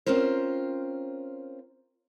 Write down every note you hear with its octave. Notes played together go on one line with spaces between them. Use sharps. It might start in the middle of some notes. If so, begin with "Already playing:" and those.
C4 C#4 F4 A#4 C5